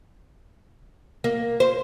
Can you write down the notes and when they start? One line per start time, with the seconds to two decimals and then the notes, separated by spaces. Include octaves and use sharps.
1.24 A#3
1.60 C5